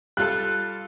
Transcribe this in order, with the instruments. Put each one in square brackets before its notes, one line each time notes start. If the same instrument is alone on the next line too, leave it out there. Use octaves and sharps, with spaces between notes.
[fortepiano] G3 F4 A4 [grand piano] F#6